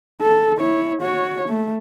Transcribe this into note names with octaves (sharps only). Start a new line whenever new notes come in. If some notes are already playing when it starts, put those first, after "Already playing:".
A4
E4 C#5
F#4 C#5
A3